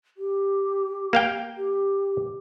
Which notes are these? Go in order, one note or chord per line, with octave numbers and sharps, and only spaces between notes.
G4
A#3 F5 G5
G4